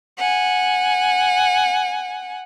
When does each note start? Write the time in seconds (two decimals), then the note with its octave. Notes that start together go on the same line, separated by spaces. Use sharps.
0.18 F#5 G#5